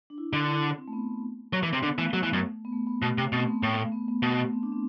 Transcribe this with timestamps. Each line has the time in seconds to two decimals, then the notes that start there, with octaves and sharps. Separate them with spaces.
0.10 D4
0.18 E4
0.33 D3 D4
0.48 E4
0.78 C4
0.88 A3
0.93 B3
1.53 F#3
1.63 E3
1.73 C3
1.83 D3 B3
1.98 E3 A3
2.13 F#3
2.23 E3
2.33 F#2
2.65 B3
2.72 A3
2.87 B3
3.02 B2 A3
3.18 C3
3.32 B2 C4
3.43 A3
3.47 B3
3.62 A2 A3
3.78 A3
3.92 B3
4.08 B3
4.22 B2 A3
4.33 A3
4.43 B3
4.53 C4
4.63 D4
4.72 C4